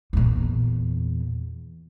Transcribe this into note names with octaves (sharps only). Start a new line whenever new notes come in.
E2 A#2